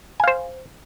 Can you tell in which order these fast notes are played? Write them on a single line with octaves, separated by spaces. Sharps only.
G#5 F5 C5